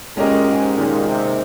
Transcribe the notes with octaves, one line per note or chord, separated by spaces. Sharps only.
A#2 G#3 C#4 G4 A#4 D#5
G#2
A#2 D#3 G#3 D#4
C3